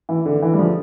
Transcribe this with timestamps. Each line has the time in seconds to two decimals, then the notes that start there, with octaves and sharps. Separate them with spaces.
0.09 E3
0.26 D3
0.42 E3
0.54 G3
0.59 D3 F3